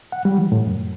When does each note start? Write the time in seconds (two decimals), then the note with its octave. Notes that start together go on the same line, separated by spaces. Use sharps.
0.12 F#5
0.25 G3
0.38 E3
0.52 A2
0.67 F#2